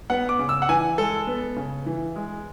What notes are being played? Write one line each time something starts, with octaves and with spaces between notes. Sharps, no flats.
B3 F#5
D6
C#3
E6
F#5
E3 G#5
G#3 A4
B3
C#3
E3
G#3